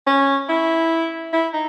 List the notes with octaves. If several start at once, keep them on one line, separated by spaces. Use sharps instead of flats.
C#4
E4
E4
D#4